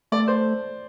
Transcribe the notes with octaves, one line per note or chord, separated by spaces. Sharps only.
A3 D5
C5